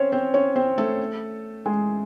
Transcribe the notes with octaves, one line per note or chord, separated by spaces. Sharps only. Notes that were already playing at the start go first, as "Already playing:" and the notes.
Already playing: C4 C#4 C5 C#5
C4 C5
C#4 C#5
C4 C5
A3 A4
G#3 G#4